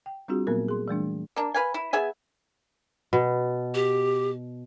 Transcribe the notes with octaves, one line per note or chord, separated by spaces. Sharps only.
G5
G3 C4 D4 F4 F#4 G#4
A#2 F#3 A#3 B3 A#4
G#4 C6
E3 G3 A3 D4
A#3 D4
B4 F5 G#5
E4
B3 G#4 E5 G#5
B2
G4